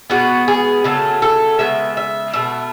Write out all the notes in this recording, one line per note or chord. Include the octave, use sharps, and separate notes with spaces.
B2 G#3 B3 F#4
G#4
C#3 F#3 A3 A4
A4
C#3 G#3 B3 E5
E5
B2 A3 E5